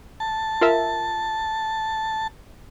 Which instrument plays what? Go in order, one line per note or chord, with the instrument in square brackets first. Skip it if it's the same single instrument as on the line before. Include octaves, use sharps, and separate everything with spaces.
[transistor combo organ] A5
[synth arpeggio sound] F4 A#4 E5